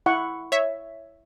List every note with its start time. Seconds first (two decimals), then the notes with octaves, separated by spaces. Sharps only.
0.06 E4 F#5 C#6
0.52 C#5 E5